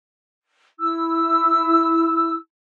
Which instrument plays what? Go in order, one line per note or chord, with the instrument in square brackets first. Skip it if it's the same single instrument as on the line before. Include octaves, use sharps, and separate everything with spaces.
[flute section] E4 E6